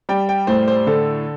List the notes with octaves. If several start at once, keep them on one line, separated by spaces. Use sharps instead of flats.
G3 G5
G5
A2 C5
C5
D3 A4